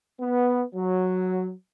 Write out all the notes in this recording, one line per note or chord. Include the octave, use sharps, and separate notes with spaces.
B3
F#3